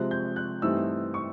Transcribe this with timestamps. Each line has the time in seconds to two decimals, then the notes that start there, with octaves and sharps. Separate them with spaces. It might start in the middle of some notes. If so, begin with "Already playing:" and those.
Already playing: C3 F3 G#3 C4 F#6
0.11 G6
0.36 F#6
0.62 G2 E3 A3 C4 D#4 E6
1.14 C#6